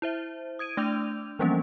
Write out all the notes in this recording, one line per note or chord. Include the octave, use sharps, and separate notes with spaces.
E4 C5 E5
D#6 G#6 D7 D#7
A3 D4 D6 E6 G6 F7
E3 F3 G3 A#3 B3 C#4